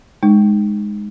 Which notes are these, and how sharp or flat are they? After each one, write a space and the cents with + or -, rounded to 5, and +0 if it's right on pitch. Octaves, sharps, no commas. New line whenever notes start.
G#3 +0 D#4 -20